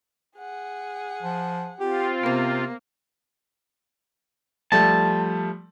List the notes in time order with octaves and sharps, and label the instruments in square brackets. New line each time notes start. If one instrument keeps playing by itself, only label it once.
[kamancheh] G#4 F#5
[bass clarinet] F3
[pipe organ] C4 F4 [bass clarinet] G4
[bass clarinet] C3 [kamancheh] A#3 [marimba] B3 C5
[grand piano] F3 G3 A3 [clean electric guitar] A5